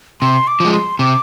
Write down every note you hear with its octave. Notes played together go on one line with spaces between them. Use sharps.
C3 C6
D6
F3 G#3
C6
C3 D6